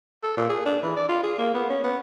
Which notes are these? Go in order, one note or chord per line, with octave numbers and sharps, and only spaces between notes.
A4
A#2
G#4
D4
E3
D5
F4
G#4
A#3
B3
C#4
B3